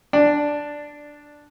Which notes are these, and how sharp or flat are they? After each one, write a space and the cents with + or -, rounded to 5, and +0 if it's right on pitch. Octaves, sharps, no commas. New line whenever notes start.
D4 +0 D5 +10 G5 +45